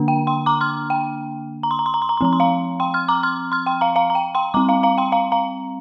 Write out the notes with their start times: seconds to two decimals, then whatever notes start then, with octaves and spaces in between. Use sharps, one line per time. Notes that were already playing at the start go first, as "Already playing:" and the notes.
Already playing: D3 A#3 D4
0.08 G5
0.27 G5 C6
0.46 A#5 D6
0.61 C6 F6
0.90 G5
1.63 A#5
1.71 C6
1.79 A#5
1.86 C6
1.94 A#5
2.02 C6
2.09 A#5
2.17 C6
2.21 F3 C4 A#5
2.33 C6
2.40 F5 A#5
2.80 G5 C6
2.94 C6 F6
3.08 A#5 D6
3.23 C6 F6
3.52 C6 F6
3.66 G5 C6
3.81 F5 A#5
3.96 F5 A#5
4.10 A#5
4.15 G5
4.35 G5 C6
4.54 G3 C4 A#5 D6
4.69 F5 A#5
4.83 F5 A#5
4.98 G5 C6
5.12 F5 A#5
5.32 F5 A#5